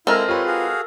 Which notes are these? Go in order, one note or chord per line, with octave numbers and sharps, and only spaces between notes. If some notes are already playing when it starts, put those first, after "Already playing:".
G#3 C4 E4 A4 A#4 F5
F4 G4 B4 C#5
F#4 G#4 F5